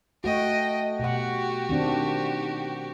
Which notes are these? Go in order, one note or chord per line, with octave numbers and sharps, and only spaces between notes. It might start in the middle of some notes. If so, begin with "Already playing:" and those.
A3 F#4 D#5 G5
B2 F#4 G4 F#5
D#3 C4 D4